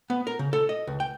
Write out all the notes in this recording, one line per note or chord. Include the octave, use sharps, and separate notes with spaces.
B3
A#4
C#3
A4
D#5
C#2
G5